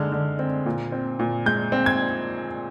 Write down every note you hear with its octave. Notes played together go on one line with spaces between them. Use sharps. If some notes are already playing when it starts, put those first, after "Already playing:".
Already playing: D3 G#3 F6
D3
C4
A#2
C4
A#2
G#3 G6
C4
G#6